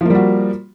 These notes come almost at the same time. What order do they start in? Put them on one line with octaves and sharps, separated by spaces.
F3 A#3 G3 F#4